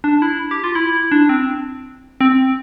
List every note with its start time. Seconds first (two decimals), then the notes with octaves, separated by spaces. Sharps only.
0.04 D4
0.22 E4
0.51 G4
0.64 F4
0.75 E4
1.12 D4
1.29 C4
2.21 C4